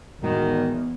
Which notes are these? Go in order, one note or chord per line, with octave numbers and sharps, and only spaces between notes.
E2 A2 D#3 G3 G#3 F#4